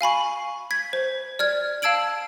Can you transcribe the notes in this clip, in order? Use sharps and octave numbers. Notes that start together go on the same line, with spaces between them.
F5 G#5 B5 C#6
G#6 B6
C5
D5 F6 G#6
F5 A5 E6 G#6 D7 F#7